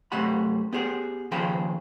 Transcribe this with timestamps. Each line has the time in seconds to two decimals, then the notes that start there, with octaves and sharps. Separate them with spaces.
0.12 F#2 C3 A3 G4 F#5 B5
0.73 B3 G4 G#4 F#5
1.31 D#2 C#3 F3 G#4 G5 B5